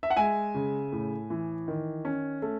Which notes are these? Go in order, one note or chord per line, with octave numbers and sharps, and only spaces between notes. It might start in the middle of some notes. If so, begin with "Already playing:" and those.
E5
F#5
G#3 E5 G#5
C#3
A2
E3
D#3
C#4
A3